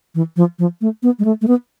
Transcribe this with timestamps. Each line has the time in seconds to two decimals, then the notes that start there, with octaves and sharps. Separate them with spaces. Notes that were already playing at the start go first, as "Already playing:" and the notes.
0.15 E3
0.36 F3
0.59 F3
0.81 A3
1.03 B3
1.19 G#3
1.25 A3
1.42 A3
1.48 B3